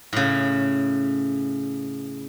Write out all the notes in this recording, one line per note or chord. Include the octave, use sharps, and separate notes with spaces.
A2 C#3